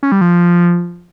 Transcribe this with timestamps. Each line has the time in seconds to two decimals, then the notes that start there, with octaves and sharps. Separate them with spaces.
0.03 C#4
0.12 G3
0.21 F3